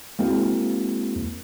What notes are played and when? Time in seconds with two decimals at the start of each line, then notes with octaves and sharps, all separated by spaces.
0.19 G#3 A#3 C4 E4 F#4